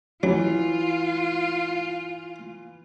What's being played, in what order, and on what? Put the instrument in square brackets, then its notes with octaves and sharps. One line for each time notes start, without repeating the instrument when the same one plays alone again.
[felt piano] E3 [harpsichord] F#3 [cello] F4